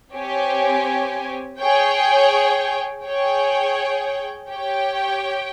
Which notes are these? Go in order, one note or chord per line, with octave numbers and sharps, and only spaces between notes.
C4 G4 C#5 G#5
G#4 C#5 G5
G#4 C#5 G5
G4 C#5 G5